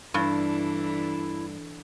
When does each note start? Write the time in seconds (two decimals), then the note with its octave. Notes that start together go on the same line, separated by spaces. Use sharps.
0.14 G2 E3 D4 E4 A4